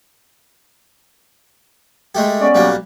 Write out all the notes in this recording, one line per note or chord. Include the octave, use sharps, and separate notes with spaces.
G#3 A3 G4
B3 C#4 D5
B1 G3 A#3